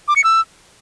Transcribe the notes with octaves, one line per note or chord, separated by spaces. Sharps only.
D6
C#7
E6